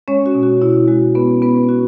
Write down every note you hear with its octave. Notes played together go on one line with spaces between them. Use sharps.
G#3 C#4 C#5
F#4
B2
F#4
B2 E4
G#3 F#4
B3 C#4 B4
B3 C#4 B4
C#4 F#4